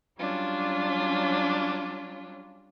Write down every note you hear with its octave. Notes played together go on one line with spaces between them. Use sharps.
F#3 G3 C#4 D4 F4